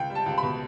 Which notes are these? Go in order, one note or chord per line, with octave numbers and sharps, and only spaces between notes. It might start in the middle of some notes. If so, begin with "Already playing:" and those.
Already playing: C#2 G5
G3
A5
C#2
B5
B2